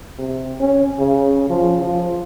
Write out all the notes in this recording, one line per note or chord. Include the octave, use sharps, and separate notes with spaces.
C3
C#4
C#3
F3
F3